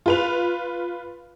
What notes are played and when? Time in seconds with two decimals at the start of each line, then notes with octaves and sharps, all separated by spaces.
0.06 F4 B4 F7